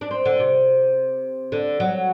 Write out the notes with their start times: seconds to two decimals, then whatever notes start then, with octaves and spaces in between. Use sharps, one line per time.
0.01 D4
0.11 C4
0.25 D3
0.39 C3
1.52 D3
1.80 F#3